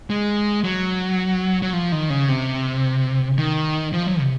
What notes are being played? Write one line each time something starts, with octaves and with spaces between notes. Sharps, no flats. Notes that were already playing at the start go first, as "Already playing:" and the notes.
G#3
F#3
F#3
F3
D#3
C#3
C3
D#3
F3
F#3
C3